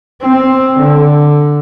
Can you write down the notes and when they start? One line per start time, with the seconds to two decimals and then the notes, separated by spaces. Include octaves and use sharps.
0.21 C4
0.80 D3